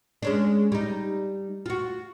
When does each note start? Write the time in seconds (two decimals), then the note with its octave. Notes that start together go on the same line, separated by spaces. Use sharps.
0.23 G#3 C#4 D4
0.72 G3 D#4
1.66 F4 F#4